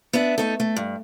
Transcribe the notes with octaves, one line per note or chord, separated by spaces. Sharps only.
B3 D4 B4 E5
A3 D#4 A4
A3
G2